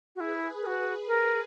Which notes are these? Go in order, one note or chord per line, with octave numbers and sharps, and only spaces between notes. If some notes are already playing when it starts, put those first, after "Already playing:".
E4 F#4 G#4 B4
A#4
F#4
A#4